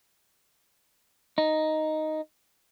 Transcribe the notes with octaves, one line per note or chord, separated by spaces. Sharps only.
D#4